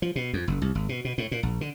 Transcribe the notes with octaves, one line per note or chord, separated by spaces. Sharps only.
F3
B2
F2
F#1
C2
G#1
B2
B2
A2
A#2
A#1
D3